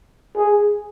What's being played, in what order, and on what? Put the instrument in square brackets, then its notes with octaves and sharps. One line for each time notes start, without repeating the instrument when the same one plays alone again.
[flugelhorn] G#4